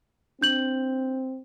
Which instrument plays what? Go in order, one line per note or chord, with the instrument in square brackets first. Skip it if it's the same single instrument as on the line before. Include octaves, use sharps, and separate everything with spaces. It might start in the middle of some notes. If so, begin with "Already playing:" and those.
[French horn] C4 [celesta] D4 G6 F#7